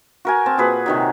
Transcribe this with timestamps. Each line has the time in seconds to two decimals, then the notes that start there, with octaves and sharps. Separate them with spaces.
0.25 F#4 A#4 G#5
0.46 C4 A5
0.58 A#2 F#4 G#4 B4
0.86 C3 D#3 F#3